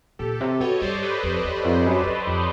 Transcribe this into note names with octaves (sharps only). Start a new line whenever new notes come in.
A#2 G4 A4
C3 G4 A4
B2 C#5 D#5
G2 C5 D5
B4 C#5
F2
E2
F2
F#2
F#2
F2